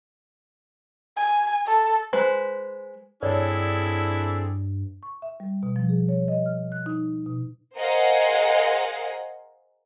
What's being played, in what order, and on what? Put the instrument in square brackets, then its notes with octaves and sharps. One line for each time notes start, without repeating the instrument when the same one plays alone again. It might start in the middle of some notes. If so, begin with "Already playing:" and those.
[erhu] G#5
A4
[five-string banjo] G#3 B4 C5
[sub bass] G2 [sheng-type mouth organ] C4 G#4 A4 [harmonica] D4 E4 [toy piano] C#5 D5
[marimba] C#6
E5
G3
B2
F3
G#4
C#5
D#5
F6
F#6
D#4
B2
[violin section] G#4 A#4 C5 D#5 F5 F#5